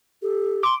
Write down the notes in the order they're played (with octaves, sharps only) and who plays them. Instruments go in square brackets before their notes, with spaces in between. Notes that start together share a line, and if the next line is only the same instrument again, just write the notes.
[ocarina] G4 [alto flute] A4
[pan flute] C6 [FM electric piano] D6